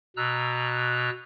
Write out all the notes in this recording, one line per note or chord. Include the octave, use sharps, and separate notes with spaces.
B2 A#5 E6 F#6